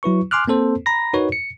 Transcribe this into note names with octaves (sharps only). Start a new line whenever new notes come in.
F#3 E4 B4 C#6
G#5 C6 D6 F6 F#6
A#3 C4 A4 C5
A#5 B5 A#6
D#4 F#4 A#4 B4 C#5
C#7